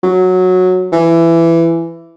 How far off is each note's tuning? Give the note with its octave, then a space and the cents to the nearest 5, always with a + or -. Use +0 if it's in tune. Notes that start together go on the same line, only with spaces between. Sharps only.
F#3 -10
E3 +15